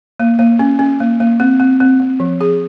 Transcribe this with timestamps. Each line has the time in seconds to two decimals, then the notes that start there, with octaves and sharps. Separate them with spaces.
0.20 A#3
0.39 A#3
0.59 C#4
0.79 C#4
1.00 A#3
1.20 A#3
1.40 C4
1.60 C4
1.80 C4
2.00 C4
2.20 F3
2.41 G#4